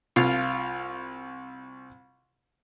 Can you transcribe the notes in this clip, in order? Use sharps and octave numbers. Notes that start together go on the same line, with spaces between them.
C2 F4 F5